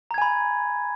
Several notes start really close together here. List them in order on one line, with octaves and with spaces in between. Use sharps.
A#5 G#6 G#5 B5